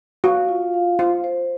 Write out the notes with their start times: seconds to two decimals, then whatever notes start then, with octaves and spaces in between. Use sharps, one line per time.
0.24 F#4 F5
0.49 F4
0.74 F5
0.99 F4 C5
1.24 C5